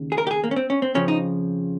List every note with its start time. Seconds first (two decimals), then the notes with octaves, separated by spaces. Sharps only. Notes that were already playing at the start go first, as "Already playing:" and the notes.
Already playing: D#2 C#3
0.12 G#4
0.18 A#4
0.27 G4
0.31 G#4
0.44 A#3
0.51 C#4
0.56 C4
0.70 C#4
0.82 C4
0.95 F2 C#3 F3 C#4
1.08 D#4